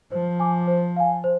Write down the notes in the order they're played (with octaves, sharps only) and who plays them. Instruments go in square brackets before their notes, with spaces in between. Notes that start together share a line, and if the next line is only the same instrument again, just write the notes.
[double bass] F3 [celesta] C5
[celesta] G#5 D6
C5
F5 G#5
C5